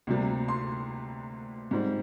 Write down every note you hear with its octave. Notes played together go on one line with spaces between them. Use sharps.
D2 C3 G3 A#3
C6
G#2 G3 C4